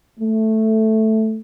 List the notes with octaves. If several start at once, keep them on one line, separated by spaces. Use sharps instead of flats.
A3